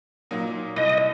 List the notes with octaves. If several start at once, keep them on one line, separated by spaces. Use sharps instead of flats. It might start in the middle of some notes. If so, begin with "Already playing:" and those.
A#2 F#3 A#3 D#4
C2 D#5